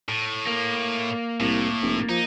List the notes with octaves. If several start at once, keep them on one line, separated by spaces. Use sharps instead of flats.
A2
A#3
C2 A2
F1
F3 D#4